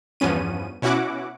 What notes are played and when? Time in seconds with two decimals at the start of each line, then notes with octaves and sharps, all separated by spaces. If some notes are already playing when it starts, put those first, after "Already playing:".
0.20 E2 G2 F3 B3 C#4 D#7
0.82 B2 C#4 E4 F#4 F#5 D6